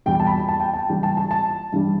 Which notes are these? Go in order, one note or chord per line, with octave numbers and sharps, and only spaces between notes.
E2 B2 G3 G5
A5
B5
A5
G5
A5
C#2 C#3 E3 G3 G5
A5
A5
A5
G2 E3 G3